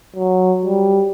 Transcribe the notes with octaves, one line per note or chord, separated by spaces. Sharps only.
F#3
G3